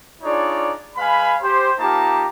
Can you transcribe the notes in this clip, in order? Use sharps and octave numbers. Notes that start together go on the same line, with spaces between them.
D4 D#4 F4 G#4 C#5 D5
G#3 B4 F5 G#5 B5
G4 C5
A#3 D#4 F4 G4 A5 A#5